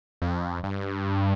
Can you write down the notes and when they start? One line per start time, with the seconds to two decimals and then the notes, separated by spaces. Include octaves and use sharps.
0.22 F2
0.63 G2